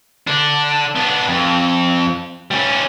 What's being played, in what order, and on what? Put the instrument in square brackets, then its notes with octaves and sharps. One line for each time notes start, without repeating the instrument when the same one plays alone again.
[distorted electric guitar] D3 D4
B3 D4
F2
G3 C#4